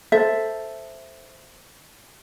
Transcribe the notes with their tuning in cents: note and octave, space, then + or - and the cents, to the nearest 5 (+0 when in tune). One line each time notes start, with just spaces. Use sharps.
A4 +0 C5 +0 E5 +5